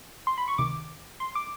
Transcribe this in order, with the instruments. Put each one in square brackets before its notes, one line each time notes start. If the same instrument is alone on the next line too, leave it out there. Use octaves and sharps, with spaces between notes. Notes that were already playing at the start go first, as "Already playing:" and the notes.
[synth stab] C6
B5
C#6
C#2 C3 D#3 D6
C6
D6